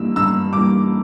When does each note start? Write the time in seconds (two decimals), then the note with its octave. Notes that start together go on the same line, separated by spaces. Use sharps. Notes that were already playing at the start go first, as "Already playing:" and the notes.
Already playing: G2 E3 G3 A#3 E6
0.16 G2 E6
0.53 E3 G3 A#3 D6